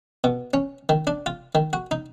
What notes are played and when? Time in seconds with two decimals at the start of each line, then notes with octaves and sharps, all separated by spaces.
0.24 B2
0.54 C#4
0.89 D#3
1.07 D4
1.26 F4
1.55 D#3
1.73 F#4
1.91 D#4